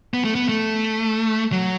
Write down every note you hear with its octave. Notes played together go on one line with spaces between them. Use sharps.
B3
A3
B3
A3
F#3